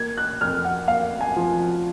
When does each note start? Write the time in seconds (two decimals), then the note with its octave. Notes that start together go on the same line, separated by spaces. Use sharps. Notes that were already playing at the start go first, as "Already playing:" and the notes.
Already playing: A#3 G#6
0.17 F#6
0.41 F2 F6
0.65 F#5
0.88 A#3 F5
1.21 G#5
1.36 F3